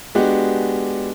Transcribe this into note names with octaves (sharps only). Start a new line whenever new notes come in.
G#3 B3 D4 F#4 G4